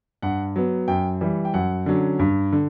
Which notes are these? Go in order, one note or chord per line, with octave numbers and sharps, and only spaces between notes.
G2 F#5
F#3 B3
F#2 G5
E3 G3
G5
F#2 F#5
D3 F#3 C#4
G2
D3